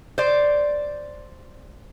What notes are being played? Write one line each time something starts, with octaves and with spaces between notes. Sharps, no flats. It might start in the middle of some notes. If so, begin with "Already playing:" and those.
C5 D5